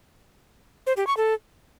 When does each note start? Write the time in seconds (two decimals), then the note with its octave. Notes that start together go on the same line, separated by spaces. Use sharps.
0.87 C5
0.97 G4
1.07 C#6
1.17 A4